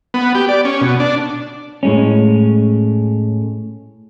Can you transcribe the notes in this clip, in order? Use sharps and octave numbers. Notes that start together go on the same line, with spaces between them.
B3
G4
D5
C#4
B2
D4
A2 G#3 C#4